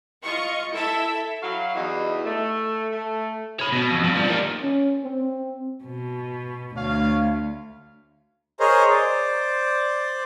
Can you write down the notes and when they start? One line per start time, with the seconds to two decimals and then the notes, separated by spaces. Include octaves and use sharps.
0.23 F4 D#5 C#6
0.70 E4 A4 E5
1.42 F#3 E4 F#4 F5
1.75 E2 E3 G3 D#4 F#4 D#5
2.25 A3
2.91 A3
3.60 C#5 B5
3.72 B2
3.91 F2
4.04 G2
4.15 F3 G3
4.30 A#2 D#3
4.62 C#4
5.04 C4
5.84 B2
6.77 D2 C#5 F5
8.60 G#4 A#4 C5 C#5 D#5
8.90 C5 D5